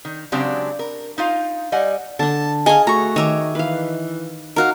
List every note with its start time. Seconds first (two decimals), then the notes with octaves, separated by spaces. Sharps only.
0.05 D#3
0.32 C#3 F#3 G#3 C4 D4 G4
0.79 A#4
1.18 D#4 F4 F5
1.72 G3 D#5 F#5 G#5
2.19 D3 D4 A5
2.66 G#4 D#5 F5 G#5 A#5 C#6
2.87 A3 F#4 A#5 C#6
3.16 D#3 C#5 D#5 E5 A#5 D6
3.55 E3 B4 F5
4.56 D#4 F#4 A#4 F5 F#5